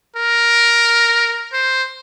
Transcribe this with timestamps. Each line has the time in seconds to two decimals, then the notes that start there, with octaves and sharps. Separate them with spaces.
0.16 A#4
1.53 C5